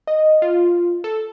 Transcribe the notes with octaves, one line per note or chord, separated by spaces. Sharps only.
D#5
F4
A4